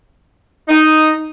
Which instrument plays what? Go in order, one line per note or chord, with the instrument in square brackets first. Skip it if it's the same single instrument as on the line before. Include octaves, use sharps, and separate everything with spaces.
[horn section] D#4